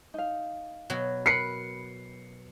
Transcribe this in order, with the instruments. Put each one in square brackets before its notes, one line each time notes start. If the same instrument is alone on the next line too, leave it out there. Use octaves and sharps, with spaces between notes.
[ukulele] D#4 F5
[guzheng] B2 F#3
[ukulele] A#4 B5 [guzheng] B4 [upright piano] C7 C#7